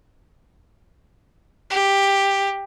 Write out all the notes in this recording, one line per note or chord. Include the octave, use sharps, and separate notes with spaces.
G4